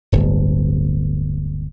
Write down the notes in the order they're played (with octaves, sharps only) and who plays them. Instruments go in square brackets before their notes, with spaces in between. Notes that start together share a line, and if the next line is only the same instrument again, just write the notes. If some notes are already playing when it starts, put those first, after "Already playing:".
[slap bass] D1 G1